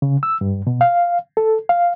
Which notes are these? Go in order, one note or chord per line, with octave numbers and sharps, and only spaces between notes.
C#3
E6
G2
B2
F5
A4
F5